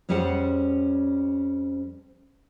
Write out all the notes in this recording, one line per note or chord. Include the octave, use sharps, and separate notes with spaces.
F2 G3 C#4 G#4 C5 F#5